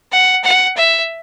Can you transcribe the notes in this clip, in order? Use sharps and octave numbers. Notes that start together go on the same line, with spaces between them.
F#5
F#5
E5